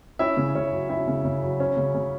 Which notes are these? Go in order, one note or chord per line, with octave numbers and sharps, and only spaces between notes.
C#4 E4 E5
C#3
C#3 C#4 C#5
F#3
C#4 E4 E5
C#3
C#3
F#3
C#4
C#3
C#3